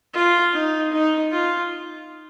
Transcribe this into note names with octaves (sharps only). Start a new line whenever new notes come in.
F4
D#4
D#4
F4